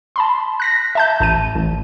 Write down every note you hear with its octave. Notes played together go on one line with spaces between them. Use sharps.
A5 B5 C6
F#6 A#6 B6
E5 A5 G6
A1 A5 D#7
A1